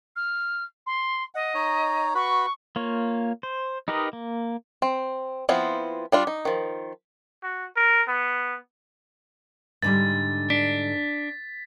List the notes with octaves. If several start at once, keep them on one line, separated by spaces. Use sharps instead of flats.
F6
C6
D#5 F#5
D#4 C#5 A#5
F#4 B4 B5 C#6
A#3 F4 C#5
C5
D#4 G4 A#4 B4 D#5
A#3
C4
F3 B3 C4 E4 F4
G3 D4 F4
D#4
D#3 F3
F#4
A#4
B3
G#2 D3 G3 A6
D4 B6